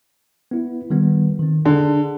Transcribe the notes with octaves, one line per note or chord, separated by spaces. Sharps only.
B3 E4
D#3 G3 B3
D#3 C4
D3 G#4